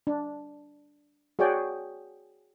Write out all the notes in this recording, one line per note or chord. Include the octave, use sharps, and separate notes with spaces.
D4
F#4 G#4 C#5 D5 G5